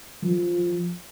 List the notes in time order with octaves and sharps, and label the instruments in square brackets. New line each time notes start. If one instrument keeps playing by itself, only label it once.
[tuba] F3